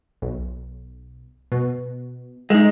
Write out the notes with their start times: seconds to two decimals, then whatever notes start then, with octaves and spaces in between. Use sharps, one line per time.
0.22 B1
1.52 B2
2.50 G#3 D#4 E5